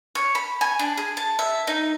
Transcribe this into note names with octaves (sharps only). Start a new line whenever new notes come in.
C#5
B5
G#5
D4
G#4
A5
E5
D#4